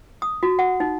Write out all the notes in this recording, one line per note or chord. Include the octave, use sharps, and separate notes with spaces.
D#6
F#4
F#5
D#4